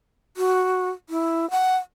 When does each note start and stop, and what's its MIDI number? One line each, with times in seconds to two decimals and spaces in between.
0.37 0.89 66
1.09 1.49 64
1.51 1.77 78